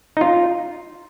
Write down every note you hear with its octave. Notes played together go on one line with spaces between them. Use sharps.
D#4
F4